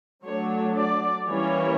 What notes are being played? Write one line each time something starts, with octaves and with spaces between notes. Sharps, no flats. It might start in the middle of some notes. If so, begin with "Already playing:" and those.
F#3 A3 D4 C#5
D5
E3 G3 A#3 C#4 C#5